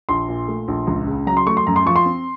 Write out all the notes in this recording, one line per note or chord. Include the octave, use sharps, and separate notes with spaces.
A#1 C6
A#2
A3
A#1
C#2
C#3
F#3 A#5
C6
A3 C#6
C6
F#2 A#5
C6
F3 C#6
C6
C4